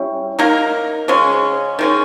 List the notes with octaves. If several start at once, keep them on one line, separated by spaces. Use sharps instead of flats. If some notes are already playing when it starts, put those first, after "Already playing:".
Already playing: G3 C#4 E4
A#3 D#4 A#4
C#3 G#3 C#4
D#3 G#3 C#4